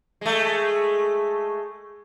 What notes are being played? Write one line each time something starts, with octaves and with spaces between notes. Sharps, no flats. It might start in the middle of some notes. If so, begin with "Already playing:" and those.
G#3 A3